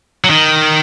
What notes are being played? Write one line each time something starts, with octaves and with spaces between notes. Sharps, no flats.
F#3
D#3